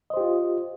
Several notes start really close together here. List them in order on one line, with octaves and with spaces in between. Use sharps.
D#5 C5 G4 F4